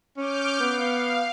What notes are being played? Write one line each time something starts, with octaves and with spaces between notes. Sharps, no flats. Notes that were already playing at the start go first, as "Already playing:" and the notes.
C#4 D6 F6 G6
B3 F5